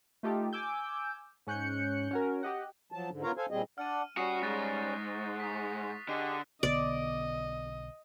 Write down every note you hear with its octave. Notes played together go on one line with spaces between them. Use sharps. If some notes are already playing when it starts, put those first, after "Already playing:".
A3 D#4 F4 G4 A4
G#5 D6 E6 G6
G#2 C#4 F#6 G6 C#7
C#4 F#4 A#4
G4 D#5 F#5
F3 F#3 A5
G#2 D3
B3 F4 A#4 C#5 F5 A#5
A4 C5 F5 G#5
A#2 G3 C4 G#4 D#5
D4 D5 F#5 F6 D#7
G3 C#4 F#4 C#6 D#6 C7
G#2 F#6 A6 A#6
G#4 D#6 B6
D3 G4 G#4 D#5 F#6 D#7
B1 D3 B3 D5 D#5